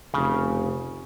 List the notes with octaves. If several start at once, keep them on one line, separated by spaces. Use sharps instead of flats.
F1 C#3